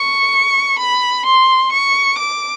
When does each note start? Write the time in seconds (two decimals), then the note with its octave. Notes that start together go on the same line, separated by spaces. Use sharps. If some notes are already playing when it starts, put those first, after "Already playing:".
Already playing: C#6
0.79 B5
1.26 C6
1.73 C#6
2.18 D6